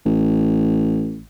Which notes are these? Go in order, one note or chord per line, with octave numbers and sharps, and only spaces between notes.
A1